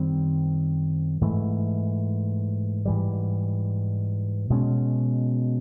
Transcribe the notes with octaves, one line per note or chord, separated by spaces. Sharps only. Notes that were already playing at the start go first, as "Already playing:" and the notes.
Already playing: F#2 D#3 G3 C4
G#2 E3 A3
G#2 E3 G3
B2 G#3 C#4